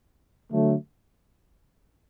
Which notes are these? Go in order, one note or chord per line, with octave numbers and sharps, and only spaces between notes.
D3 F#3 A3